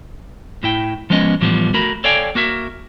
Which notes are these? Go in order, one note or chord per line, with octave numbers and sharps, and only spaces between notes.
A2 E4 G5
F3 G#3 B3 C#4 D#5
A2 E3 F3 G3 B3
A3 F#4 A#4 B5
A4 C#5 D5 F5 G5 G#5
A#3 F#4 A#4 E5